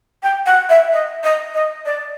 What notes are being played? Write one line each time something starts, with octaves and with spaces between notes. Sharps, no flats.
G5
F#5
E5
D#5
D#5
D#5
D5